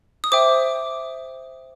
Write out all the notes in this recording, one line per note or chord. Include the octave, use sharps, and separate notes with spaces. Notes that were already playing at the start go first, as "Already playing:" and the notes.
D#6
C5 E5 G5 D6